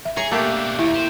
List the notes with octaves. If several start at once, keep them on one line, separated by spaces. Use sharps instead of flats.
E5
G#4 C#5 A#5
B2 A3 A#3 D4 G4 A4
D#2 E4 E5
G4 C5